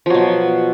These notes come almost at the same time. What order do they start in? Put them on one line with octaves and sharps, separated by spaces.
F3 F#3 B2